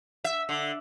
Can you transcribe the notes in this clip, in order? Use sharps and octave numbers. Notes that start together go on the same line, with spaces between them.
E5
D3